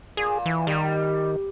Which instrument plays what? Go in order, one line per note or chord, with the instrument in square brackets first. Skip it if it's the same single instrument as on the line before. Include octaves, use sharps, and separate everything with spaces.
[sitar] A#2 [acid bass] G#4
[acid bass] E3
[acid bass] D#3 [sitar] G3